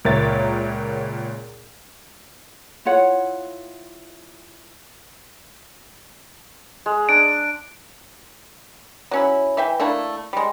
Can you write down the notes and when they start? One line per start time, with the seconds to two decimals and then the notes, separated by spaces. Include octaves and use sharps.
0.05 C#2 A#2 A#4 C#5 E5 A6
2.85 E4 F4 C#5 F#5
6.86 G#3
7.09 D4 D7
9.11 F#3 C#4 E4
9.57 E3 E5 G5
9.80 A3 A#3 D4 E4
10.33 G3 G#3